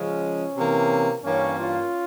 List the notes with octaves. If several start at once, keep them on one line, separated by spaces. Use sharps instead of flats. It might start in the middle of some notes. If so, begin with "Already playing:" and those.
Already playing: C#3 F3 G#3 C#4
C3 E3 A#3
G2 E3 A#3 C#4
C#4 F4